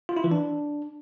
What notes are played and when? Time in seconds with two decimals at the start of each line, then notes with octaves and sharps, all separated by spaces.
0.09 F4
0.17 E4
0.24 E3
0.31 D4